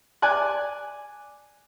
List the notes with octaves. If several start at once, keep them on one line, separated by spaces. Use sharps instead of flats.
D5 G#5 F#6